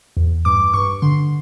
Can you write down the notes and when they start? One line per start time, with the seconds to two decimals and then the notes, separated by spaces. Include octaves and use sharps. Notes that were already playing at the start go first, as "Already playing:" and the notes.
0.17 E2
0.45 G2 D6
0.74 G2 C#6
1.02 D3 C6